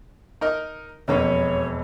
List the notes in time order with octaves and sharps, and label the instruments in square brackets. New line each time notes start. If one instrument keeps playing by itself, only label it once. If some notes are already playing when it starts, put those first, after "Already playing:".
[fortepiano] D#4 A#4 D#5
[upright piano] E1 F2 B5 [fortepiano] B2 A#3 C#4 [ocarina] C#5